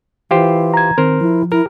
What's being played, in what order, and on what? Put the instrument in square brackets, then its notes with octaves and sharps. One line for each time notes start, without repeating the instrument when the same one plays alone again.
[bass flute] E3 [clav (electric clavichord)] F4 G4 C5
[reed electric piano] A#5 G#6
[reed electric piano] D#3 C4 [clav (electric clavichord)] A#4 C5
[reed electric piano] F3 [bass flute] E4
[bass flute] E4 [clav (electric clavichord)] A#4